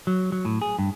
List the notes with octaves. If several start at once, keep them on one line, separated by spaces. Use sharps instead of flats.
F#3
F#3
A2
G#4
G2